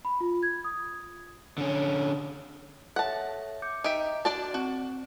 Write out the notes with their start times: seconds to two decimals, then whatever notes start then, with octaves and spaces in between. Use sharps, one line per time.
0.05 B5
0.20 F4
0.43 G#6
0.64 D#6
1.58 D3 C#4
2.96 A4 C#5 E5 F#5 A5
3.62 D6 G6 C#7
3.84 D#4 G4 D#5 E5
4.25 D4 F#4 D5 A5
4.54 C4 F#4